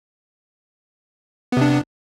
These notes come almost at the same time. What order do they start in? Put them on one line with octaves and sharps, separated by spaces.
B3 C3 D4